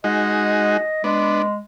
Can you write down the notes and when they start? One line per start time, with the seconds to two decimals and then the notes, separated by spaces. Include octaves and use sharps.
0.04 G#3 D#4 F#4 D#5
1.04 G#3 B3 D4